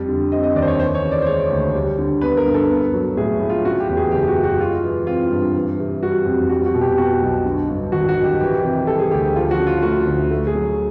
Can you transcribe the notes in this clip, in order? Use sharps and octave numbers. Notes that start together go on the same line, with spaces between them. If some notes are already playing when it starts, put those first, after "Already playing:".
Already playing: F2 G3
D3
C4 D#5
D#5
D#2 D5
C5
C#5
E3 C5
C#5
C#3
D5
C5
G#3 C#5
D2
G3
D3
B3 B4
A#4
G2
A4
B3
F#3
A2 G#4
A2
F4
C#3 F#4
G4
E2
G#4
F#1 G4
F#4
F#1
F#4
G#3 F4
E3
C4 F4
G2
E3
C3
G3 F#4
F2
G3 F#4
F#4
B2
G4
B3 F#4
B1
D3
G2
G#1 F#4
F#4
G#1
G4
E3 G4
C3
G3 A4
G#4
D2 G4
F3 F4
F#4
C#3
F4
A3 F#4
D2
A3
G#4
F#3